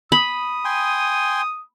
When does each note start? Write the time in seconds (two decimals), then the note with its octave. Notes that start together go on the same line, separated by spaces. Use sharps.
0.12 B5 D#6
0.65 G5 G#5 C6